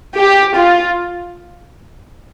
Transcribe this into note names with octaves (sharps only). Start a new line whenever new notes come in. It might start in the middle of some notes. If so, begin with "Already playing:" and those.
G4
F4